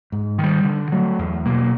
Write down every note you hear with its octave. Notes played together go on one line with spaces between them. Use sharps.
G#2
D#3 G3
D3
F#3 A3
E2
B2 F#3 A#3